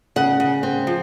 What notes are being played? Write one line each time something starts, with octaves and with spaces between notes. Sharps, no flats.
C#3 F#5
C#3
C4
F3